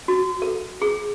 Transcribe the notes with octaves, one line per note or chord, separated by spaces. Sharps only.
F#4
A4
G#4